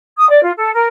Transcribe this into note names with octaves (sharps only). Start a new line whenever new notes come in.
D#6
D5
F4
A4
A#4